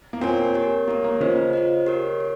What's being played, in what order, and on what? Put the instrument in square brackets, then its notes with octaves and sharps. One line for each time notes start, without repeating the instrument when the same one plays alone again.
[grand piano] A#3
[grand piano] C4 [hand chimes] F4 A#4 C#5 G#5
[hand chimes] G4 A#4 C#5
[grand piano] A#3 [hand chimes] G4 A#4 C#5
[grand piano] A#3
[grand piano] C#3 C#4 [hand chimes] F4 C5 D#5
[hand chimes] F4 C5 D#5
G4 A#4 C#5
C#5